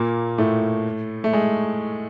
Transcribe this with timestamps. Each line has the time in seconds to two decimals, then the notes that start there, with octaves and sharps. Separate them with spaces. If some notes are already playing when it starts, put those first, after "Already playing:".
Already playing: A#2 A#3
0.38 A2 A3
1.24 A3
1.33 G#3